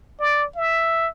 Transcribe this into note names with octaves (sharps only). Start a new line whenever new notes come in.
D5
E5